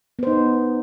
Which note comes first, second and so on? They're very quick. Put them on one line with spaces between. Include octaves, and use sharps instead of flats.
B3 C5 D#4